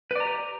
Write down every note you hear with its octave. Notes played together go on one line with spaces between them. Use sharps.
G4 B4 D5 A#5